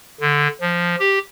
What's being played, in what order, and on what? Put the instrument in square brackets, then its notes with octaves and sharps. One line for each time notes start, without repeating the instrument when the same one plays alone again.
[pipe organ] D3
F3
G4